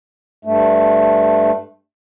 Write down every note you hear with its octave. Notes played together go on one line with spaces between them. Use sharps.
G2 A3